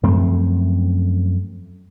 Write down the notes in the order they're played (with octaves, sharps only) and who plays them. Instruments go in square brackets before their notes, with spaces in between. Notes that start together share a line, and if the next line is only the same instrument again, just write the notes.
[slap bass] F#2 F3 A3 C4